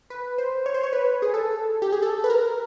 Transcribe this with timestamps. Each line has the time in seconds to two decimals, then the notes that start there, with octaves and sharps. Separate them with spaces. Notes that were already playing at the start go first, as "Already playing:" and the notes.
0.10 B4
0.38 C5
0.66 C#5
0.74 C5
0.83 C#5
0.93 B4
1.22 G#4
1.34 A4
1.82 G4
1.92 G#4
2.02 A4
2.24 B4
2.30 A#4